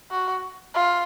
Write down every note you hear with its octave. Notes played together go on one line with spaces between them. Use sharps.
F#4
F4